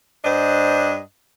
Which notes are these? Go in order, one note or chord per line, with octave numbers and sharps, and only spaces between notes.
G2 D4 C5 D#5